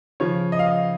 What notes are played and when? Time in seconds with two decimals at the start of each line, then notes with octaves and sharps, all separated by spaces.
0.20 C#3 F3 C#5
0.52 D#5
0.59 F5
0.66 D#5